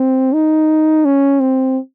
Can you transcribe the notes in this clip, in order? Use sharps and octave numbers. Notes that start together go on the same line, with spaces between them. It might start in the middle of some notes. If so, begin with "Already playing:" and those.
Already playing: C4
D#4
C#4
C4